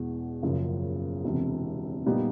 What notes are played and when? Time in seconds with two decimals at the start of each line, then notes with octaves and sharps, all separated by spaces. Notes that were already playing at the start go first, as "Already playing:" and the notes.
Already playing: E2 B2 G#3
0.42 F#1 F#2 C#3 F3
1.24 E1 E2 C3
2.06 A#2 G3 B3 D#4